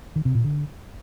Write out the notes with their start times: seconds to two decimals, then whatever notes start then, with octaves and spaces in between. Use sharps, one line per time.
0.16 D#3
0.25 C3
0.35 A#2
0.44 D3